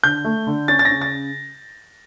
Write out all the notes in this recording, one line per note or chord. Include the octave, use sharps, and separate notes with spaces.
D3 G6
A3
D3
C#4 A6
A6
C#3 A#6
A6